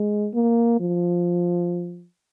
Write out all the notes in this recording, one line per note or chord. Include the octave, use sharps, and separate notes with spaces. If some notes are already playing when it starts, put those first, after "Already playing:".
Already playing: G#3
A#3
F3